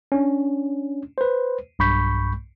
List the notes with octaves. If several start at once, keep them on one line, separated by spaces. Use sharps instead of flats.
C#4 D4
B4 C5
B1 G2 B5 C#6 G6 B6